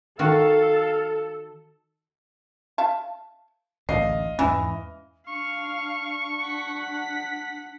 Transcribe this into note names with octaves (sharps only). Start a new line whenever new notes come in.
D#3 F#4 A4 F5
E5 F5 A5
A1 D2 A2 D4 D#5 F5 C7
E2 G#2 E3 C#4
D4 F5 C#6
F#5 B6